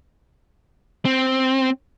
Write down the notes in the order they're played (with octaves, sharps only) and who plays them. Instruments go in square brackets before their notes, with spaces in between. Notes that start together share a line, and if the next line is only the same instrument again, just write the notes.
[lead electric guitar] C4